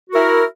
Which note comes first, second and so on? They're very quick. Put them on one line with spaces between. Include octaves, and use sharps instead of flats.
F#4 A#4 E4